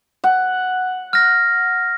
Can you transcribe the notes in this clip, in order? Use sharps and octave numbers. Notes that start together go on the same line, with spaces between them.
F#5
F6 A#6